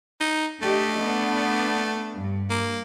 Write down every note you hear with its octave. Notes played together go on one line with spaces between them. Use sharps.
D#4
A3 D4 G4 D#5
B3 D4
G2
A#3